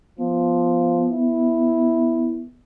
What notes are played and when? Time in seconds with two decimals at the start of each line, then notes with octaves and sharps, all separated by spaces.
0.19 F3 B3
1.11 E4